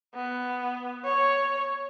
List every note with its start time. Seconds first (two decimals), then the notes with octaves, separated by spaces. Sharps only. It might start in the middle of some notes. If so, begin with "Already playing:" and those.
0.15 B3
1.04 C#5